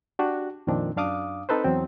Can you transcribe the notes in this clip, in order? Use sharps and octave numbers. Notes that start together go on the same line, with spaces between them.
D4 F#4 G4
F2 A#2 D#3 C4 D4
F#2 D4 F5 D6 D#6
C4 D#4 A4 B4 C5
E2 F#3 C4